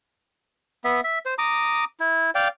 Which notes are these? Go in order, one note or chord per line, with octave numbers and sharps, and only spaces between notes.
B3 E5
E5
C5
A#5 D6 D#6
E4
D5 F5 G5